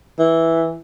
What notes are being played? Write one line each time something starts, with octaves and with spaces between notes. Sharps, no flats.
E3